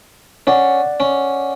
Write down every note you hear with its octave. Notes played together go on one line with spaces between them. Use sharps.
C#4 D5 F#5
C#4